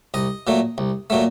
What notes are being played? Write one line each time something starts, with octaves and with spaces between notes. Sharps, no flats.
C2 D#5
A#2 F#3 A3
C2
A#2 F#3 A3